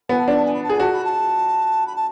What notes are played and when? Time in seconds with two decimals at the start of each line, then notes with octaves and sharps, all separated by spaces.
0.09 B3 G#5
0.18 A5
0.28 D4 B5
0.36 A5
0.44 G#5
0.53 B5
0.63 A5
0.69 G#4 G#5
0.80 F#4 A5
0.93 B5
1.04 A5
1.86 B5
1.95 A5